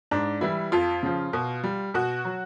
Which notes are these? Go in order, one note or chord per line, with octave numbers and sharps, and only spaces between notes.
G#2 D4
E3 G3 E4
F2 F4
C#3 F3
B2
G3
B2 F#4
F#3